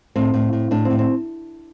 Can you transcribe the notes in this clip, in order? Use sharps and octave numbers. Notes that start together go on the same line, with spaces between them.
A2 C4
A2
A2
A2 D4
C4
A2
C4